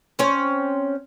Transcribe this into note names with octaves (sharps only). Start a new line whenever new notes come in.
C4 C#4 C#5